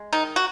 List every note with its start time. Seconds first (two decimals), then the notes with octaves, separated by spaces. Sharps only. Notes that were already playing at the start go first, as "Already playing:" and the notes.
Already playing: G#3
0.13 D#3 D#4
0.36 F#4